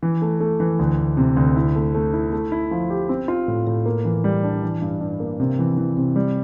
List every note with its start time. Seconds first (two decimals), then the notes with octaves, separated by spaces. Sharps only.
0.03 E3
0.22 A3
0.40 A3
0.60 E3
0.79 D2
0.98 D2
1.17 C3
1.37 D2
1.56 E4
1.75 A3
1.94 A3
2.13 E4
2.32 A3
2.52 E4
2.71 F3
2.90 G4
3.09 C4
3.28 F4
3.48 A2
3.67 A2
3.86 A#3
4.05 E3
4.24 G3
4.43 D4
4.62 E3
4.82 G2
5.01 G2
5.20 A#3
5.40 C3
5.59 E3
5.77 E3
5.97 C3
6.16 G3